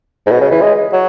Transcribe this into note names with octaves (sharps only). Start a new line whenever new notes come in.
G#2
B2
C#3
E3
G#3
F#3